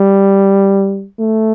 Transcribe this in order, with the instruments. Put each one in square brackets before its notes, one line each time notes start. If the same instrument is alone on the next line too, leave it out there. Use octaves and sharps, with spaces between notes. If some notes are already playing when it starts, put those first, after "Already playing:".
Already playing: [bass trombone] G3
A3